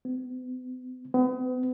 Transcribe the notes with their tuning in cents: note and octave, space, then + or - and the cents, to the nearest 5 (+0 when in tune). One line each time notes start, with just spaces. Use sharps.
B3 +45
B3 +40